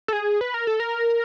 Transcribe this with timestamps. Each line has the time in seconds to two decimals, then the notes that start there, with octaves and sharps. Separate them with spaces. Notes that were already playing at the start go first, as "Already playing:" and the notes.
0.08 A4
0.13 G#4
0.41 B4
0.54 A#4
0.67 A4
0.80 A#4